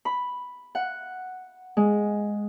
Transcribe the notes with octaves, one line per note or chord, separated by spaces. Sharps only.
B5
F#5
G#3